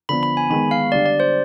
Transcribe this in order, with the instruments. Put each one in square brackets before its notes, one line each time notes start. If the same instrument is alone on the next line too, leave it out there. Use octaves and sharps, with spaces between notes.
[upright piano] D3 F3 B3 [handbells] B5
[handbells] B5
G#5
[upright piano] D#3 G#3 B3 [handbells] B5
[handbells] F5
[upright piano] D3 G3 D4 [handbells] D5
[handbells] D5
C5